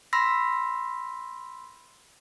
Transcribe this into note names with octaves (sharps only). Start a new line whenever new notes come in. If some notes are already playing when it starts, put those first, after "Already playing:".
B5 C6 E6 A#6 B6